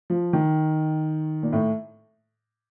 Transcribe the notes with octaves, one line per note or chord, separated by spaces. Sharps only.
F3
D#3
A#2
A2